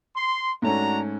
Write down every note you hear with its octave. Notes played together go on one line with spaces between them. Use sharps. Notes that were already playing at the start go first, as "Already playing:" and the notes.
C6
G#2 A3 C#4 D4 F#4 A#5